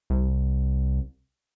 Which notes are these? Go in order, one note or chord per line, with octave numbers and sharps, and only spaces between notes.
C2